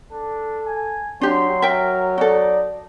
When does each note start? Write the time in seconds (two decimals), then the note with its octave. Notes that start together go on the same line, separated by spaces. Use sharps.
0.12 D4 A4
0.66 G#5
1.21 F#3 D4 G4 C6
1.62 A#4 E5 G5
2.18 D#4 F#4 A4 D5